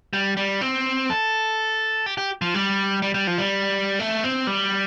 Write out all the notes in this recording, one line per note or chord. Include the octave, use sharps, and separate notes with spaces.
G3
G3
C4
A4
G4
G4
F3
G3
G3
G3
F3
G3
A3
C4
G3